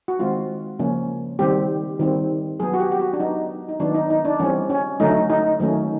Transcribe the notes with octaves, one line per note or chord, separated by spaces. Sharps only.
F#4
D#3 G#3 C4 F4
C#3 F3 A#3 C#4
D#3 G3 C4 G4
D#3 G3 C4
F#3 B3 G#4
F#4
G4
G4
F#4
D4
F#3 B3 D#4
D#4
D#3 F#3 B3 D4
D#4
D#4
D4
E3 G3 C4 C#4
C#4
D3 F#3 A3 C#4 D#4
D#4
D#3 F#3 A3 C#4